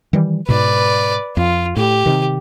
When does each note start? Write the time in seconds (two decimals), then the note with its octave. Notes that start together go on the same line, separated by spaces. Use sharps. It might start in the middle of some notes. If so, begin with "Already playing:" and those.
0.13 D#3 E3 G3
0.49 G#2 B2 B4 D5
1.37 F2 F4
1.77 A2 G4
2.06 C3 D#3